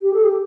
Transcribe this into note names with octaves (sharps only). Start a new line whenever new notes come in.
G4
A4
G4